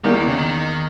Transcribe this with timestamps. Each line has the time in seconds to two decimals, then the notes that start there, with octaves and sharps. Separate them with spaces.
0.04 E2 D#3 G3 A#3
0.15 E3
0.27 C#3
0.38 D#3